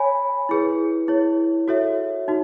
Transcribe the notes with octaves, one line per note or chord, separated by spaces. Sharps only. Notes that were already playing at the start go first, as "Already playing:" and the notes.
Already playing: C#5 G#5 B5
E4 G#4 B4
E4 G#4 C#5
F#4 A4 C#5 E5
D#4 F#4